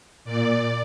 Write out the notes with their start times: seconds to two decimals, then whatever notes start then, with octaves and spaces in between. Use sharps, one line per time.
0.25 A#2 D5